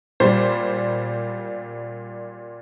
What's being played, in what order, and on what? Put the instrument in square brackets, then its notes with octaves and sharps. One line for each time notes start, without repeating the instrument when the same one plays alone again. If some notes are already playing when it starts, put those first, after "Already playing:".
[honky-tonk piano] A#2 G3 C5